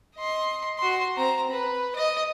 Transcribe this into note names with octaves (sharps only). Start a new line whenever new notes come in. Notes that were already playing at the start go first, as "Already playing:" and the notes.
D#5 C6
F#4 C6
C4 A#5
B4
D#5